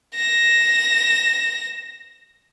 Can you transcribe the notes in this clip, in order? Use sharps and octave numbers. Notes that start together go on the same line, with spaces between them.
A#6 E7